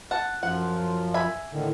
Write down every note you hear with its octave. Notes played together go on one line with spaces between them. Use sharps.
F#5 A5
F#2 F3 F4 F#5
E5 G#5 B5
A2 D3 D#3